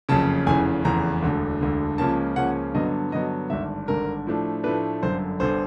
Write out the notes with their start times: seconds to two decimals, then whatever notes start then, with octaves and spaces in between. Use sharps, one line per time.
0.09 F#1 F2 C#3 A5
0.46 F1 E2 C#3 E3 G#5
0.84 F1 E2 C#3 E3 A#5
1.22 E1 D2 D3
1.61 E1 D2 D3
1.98 C#2 C#3 F3 A#3 C#4 A5
2.36 C#2 C#3 F3 A#3 C#4 F#5
2.74 G2 D3 F#3 B3 D#5
3.12 G2 D3 F#3 B3 D#5
3.50 G#1 G2 D3 E5
3.88 G#1 G2 D3 A#4
4.27 A2 F3 A3 D4
4.64 A2 F3 A3 D4 B4
5.03 G1 F#2 D3 C5
5.40 G1 D3 C5